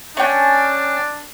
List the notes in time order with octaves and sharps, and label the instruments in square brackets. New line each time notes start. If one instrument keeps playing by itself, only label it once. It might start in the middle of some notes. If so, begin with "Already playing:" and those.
[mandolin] C#4 G5 [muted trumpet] D4